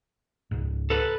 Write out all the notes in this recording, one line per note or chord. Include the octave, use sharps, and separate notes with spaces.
C#2 G#2
A4 B4